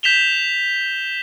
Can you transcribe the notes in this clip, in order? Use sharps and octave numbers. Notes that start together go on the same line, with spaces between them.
G6 B6 E7 F7 G7